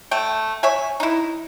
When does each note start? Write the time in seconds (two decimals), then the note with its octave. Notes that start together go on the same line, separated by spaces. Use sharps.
0.11 A3 G5
0.63 C#5 E5 G#5
1.00 D#4 E4